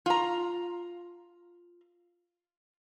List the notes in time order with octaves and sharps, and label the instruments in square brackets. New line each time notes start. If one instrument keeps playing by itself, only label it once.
[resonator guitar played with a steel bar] F4 A#5